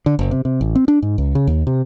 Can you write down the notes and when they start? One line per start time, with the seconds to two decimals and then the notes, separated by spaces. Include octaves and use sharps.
0.06 D3
0.19 F#1
0.31 C3
0.45 C3
0.61 A1
0.76 C4
0.88 D4
1.02 G#2
1.18 C#2
1.35 C#3
1.47 D#2
1.67 C3